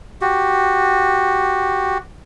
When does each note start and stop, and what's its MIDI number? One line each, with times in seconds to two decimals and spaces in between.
0.21 1.98 66
0.21 1.98 67